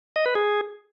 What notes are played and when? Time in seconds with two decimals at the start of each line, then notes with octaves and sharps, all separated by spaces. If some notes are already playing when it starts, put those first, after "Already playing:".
0.16 D#5
0.26 B4
0.35 G#4